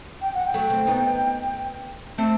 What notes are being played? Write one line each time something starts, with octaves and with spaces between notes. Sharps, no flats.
G5
F#5
G5
F#3 A3
A3 C4
B3 D#4
A3 C4 A5